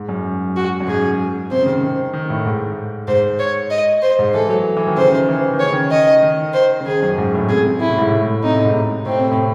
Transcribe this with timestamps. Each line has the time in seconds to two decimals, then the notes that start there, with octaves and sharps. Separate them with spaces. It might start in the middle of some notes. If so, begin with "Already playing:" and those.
Already playing: G#2
0.09 F#2
0.56 F#4
0.80 F#2
0.87 G#2 G#4
1.51 C3 C5
1.61 C#3
1.66 D#3
2.13 D#3
2.30 A2
2.45 G#2
3.08 G#2 C5
3.40 C#5
3.71 D#5
4.02 C5
4.19 G#2
4.34 E3 A4
4.49 F#3
4.77 E3
4.87 D#3
4.97 C#3 C5
5.12 D#3
5.29 E3
5.45 E3
5.54 D#3
5.60 C#3 C#5
5.73 D#3
5.91 D#5
6.23 D#3
6.54 C5
6.80 C#3
6.86 D#3 G#4
7.02 F#2
7.18 G#2
7.34 A2
7.49 C3 G#4
7.65 C3
7.80 C3 E4
7.90 A2
7.98 G#2
8.08 A2
8.44 C3 D#4
8.55 A2
8.65 G#2
8.75 C3
9.06 A2 C4
9.19 C3
9.31 A2